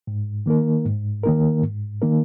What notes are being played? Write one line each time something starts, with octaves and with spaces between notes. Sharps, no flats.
G#2
D#3 A#3 D#4 A#4
G#2
D#3 A#3 D#4 A#4
G#2
D#3 A#3 D#4 A#4